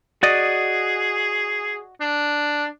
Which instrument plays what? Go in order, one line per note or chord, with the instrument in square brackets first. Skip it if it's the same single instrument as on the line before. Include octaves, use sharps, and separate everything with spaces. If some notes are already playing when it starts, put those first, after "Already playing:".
[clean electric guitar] F#4 D5 D#5 [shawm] G#4
[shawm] D4